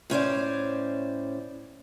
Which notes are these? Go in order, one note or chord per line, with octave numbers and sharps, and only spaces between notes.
A2 C#4 C5 D5